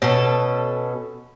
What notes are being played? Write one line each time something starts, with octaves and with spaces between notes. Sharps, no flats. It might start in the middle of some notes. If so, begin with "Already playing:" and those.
B2 C#4 A4